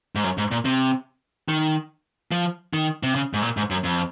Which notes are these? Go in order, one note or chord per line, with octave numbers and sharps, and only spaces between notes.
G#2
F#2
G#2
A#2
C3
D#3
F3
D#3
C3
C#3
G#2
A#2
G#2
F#2
F2